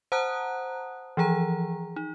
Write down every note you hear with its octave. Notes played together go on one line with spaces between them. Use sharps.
C5 F#5 A5 A#5 D#6 F#6
E3 F3 G#4 A#5
D#4